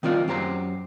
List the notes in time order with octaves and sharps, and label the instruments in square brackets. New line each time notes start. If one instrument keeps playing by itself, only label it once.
[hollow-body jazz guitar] D#3 G3 C4 F4 A#4 D5
F#2 G4 C5 A#5